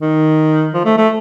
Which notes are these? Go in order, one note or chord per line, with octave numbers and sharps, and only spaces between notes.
D#3
F3
A3
A3